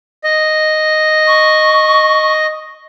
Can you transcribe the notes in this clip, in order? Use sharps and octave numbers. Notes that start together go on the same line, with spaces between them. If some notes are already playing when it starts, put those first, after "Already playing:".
D#5
C#6